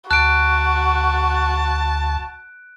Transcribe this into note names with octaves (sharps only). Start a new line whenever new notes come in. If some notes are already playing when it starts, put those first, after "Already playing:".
D2 F#4 A5 F#6 D7